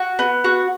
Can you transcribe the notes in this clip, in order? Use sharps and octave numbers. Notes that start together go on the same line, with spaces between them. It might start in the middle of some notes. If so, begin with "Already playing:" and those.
Already playing: F#4
B3
F#4